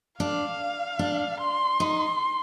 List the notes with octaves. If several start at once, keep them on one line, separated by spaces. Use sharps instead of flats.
D4 F5
D4
C6
D#4